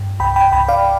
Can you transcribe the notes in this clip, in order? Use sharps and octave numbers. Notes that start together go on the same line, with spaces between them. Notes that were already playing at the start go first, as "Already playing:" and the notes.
Already playing: G2
C2 G5 B5
G5 B5
C2 G5 B5
D5 F5